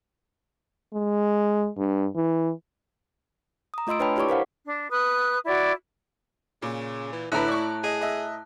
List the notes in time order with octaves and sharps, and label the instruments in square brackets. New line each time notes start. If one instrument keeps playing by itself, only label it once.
[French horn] G#3
G2
E3
[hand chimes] A#5 D#6
A3 F4 D#5 C6 E6 D7
D4 B4 C#5 G5 A5 B5
E4 G4 C#5 D5 C#6 D6
A#4 C5 F5 F#5
[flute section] D4
B4 D#6 F#6
E4 F#4 D5
[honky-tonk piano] A#2 [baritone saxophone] C#3
[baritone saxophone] E3
[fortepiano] A2 A#5 [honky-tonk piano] D3 A3 B4 [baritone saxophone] E4 [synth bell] A5 F#6
[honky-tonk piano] D5 C#6
[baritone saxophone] G#4 [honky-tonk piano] D#5
[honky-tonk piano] D#5 E5